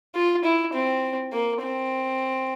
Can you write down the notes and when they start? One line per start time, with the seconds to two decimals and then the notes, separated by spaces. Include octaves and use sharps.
0.15 F4
0.44 E4
0.74 C4
1.33 A#3
1.62 C4